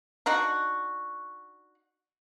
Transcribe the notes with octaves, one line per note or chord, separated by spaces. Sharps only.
D4 D#4 F#4